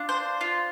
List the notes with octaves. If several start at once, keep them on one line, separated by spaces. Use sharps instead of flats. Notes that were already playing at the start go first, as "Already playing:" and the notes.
Already playing: D4 F4
C5
F4